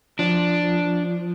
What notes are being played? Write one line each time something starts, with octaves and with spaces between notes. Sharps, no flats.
F3 D4